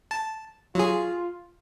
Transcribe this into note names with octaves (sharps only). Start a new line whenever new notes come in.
A5
F#3 F4 G#4